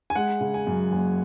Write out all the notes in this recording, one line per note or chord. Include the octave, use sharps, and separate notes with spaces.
G#5
G#3 F#5
C#3
G#5
F#2
F#1